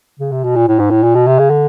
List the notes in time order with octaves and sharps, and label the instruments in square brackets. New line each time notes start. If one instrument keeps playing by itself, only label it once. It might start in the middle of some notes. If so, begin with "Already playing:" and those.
[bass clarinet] C#3
C3
B2
A#2
A2
G#2
A2
A#2
B2
C3
C#3
D3